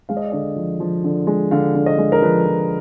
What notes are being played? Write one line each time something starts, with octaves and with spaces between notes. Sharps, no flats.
G#3 F5
D#5
D5
D3 D#5
F3
F3
D3
G#3
D3 F5
D3
D#5
G#3
A#4
F3 B4
F3